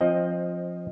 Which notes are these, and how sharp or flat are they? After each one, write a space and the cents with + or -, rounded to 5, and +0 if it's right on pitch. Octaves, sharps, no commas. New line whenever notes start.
F3 +5 C4 +20 D#5 +0